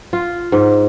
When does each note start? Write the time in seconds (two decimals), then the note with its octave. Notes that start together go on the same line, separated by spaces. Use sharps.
0.13 F4
0.52 G#2